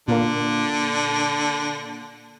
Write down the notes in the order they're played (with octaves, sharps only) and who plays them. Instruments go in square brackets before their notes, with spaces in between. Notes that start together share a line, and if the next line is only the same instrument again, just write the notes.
[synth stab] A#2 A#3 [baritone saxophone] D3